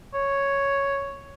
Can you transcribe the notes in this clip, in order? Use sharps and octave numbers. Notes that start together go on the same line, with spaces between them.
C#5